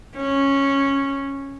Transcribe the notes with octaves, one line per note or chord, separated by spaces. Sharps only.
C#4